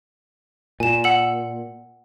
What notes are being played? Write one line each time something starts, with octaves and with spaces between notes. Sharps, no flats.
A#2 G#5 E7
F#5 E6 F#7